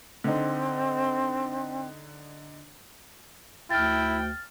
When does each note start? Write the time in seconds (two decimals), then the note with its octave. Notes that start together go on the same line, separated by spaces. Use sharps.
0.24 D3 C4 D#4
3.71 D2 E4 G5 F6 A6